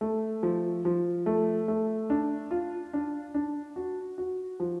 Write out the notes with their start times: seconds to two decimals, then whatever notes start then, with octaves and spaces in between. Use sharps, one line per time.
0.01 A3
0.43 F3
0.85 F3
1.26 A3
1.68 A3
2.10 D4
2.51 F4
2.93 D4
3.34 D4
3.76 F#4
4.18 F#4
4.60 F3